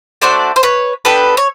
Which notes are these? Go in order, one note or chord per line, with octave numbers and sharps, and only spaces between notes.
A3 D4 F#4 C5 D5
C5
B4 C#5
B3 D4 G4 A4 B4
C#5